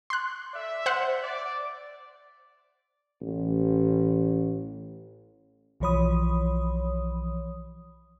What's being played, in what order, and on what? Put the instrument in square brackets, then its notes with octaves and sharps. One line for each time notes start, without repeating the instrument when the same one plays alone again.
[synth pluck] C6 F#6
[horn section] A4 D5 E5
[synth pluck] C5 F#5 F#6
[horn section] D5
[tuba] A1
[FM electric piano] B1 E3 F3 C#5 B5 D#6